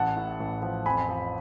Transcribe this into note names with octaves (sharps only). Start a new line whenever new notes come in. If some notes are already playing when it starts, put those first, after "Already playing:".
Already playing: A1 F#5 A5
A2
A1
F3
F2 G#5 B5
F3